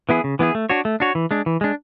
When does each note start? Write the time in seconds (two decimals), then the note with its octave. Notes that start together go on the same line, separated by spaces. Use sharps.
0.09 E3 B3 E4 G#4
0.24 C#3
0.39 E3 B3 E4 G#4
0.55 A3
0.70 D4 F#4 C#5
0.85 A3
1.00 D4 F#4 C#5
1.15 E3
1.31 G#3 D4
1.46 E3
1.61 G#3 D4